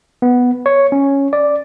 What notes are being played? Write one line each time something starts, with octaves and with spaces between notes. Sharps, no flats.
B3
C#5
C#4
D5